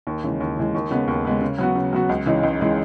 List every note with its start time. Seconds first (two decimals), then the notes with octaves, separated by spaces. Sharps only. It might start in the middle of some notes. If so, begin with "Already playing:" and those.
0.07 D#2
0.23 C#3 E3 G#3
0.40 D#2
0.57 C#3 E3 G#3
0.75 D#2
0.91 C#3 G#3 B3
1.08 D#2
1.25 C#3 G#3 B3
1.41 C#3
1.58 F#3 B3 F#4
1.75 C#3
1.93 F#3 B3 F#4
2.09 C#2
2.26 C#3 E3 G#3 D#4
2.43 C#2
2.60 C#3 E3 G#3 D#4